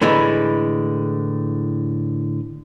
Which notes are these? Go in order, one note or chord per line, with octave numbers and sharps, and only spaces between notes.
A2 D3 E3 G#3 G#5 A#5